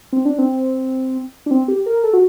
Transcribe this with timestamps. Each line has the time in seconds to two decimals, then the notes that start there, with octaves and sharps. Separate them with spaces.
0.12 C4
0.25 D4
0.38 C4
1.46 D4
1.51 C4
1.68 G4
1.86 A#4
2.04 A4
2.13 F#4